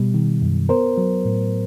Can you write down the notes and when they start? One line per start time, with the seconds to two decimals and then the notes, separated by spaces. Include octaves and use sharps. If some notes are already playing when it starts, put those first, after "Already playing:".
Already playing: B2 G3
0.14 D#3
0.42 F#2
0.69 B3 A#4 C5
0.97 F#3
1.25 A2